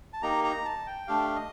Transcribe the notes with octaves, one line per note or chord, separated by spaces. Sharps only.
A5
A#3 D#4 G4 A#5
A#5
A5
G5
A3 D4 G4 F5
D#5